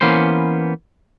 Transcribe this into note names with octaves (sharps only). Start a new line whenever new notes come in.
E3 A#3 B3 C#4 C5